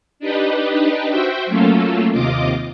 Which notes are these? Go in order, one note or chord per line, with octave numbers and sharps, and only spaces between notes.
D4 D#4 G4 B4 D#5
F#4 C5 E5 G5
F#3 A3 A#3 C#4 F4 A4
D#2 C3 F4 D#5 D6